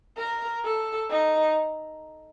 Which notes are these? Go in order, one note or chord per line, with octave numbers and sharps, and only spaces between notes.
A#4
A4
D#4